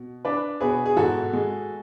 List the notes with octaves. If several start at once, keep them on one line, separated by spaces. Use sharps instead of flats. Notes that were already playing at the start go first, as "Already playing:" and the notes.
Already playing: B2
D4 B4 D5
B2 G#4 B4
G#4
G#2 F#4 A4
G#3